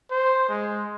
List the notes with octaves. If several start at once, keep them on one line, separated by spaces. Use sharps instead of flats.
C5
G#3